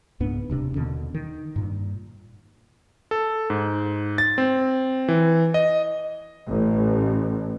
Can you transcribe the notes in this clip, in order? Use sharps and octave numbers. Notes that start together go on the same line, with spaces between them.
C#2 G#2 B3 D4
D#1 C3 C#4 D4
D#2 B2 D3 C#4
D#3
G2 A#2
A4
G#2
A6
C4
E3
D#5
A1